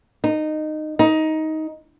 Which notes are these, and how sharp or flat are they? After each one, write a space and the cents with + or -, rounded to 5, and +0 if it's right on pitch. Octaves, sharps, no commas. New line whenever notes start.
D#4 -15
D#4 +15